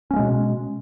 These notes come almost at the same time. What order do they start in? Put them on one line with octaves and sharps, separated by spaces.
C#4 A#3 G#3 B2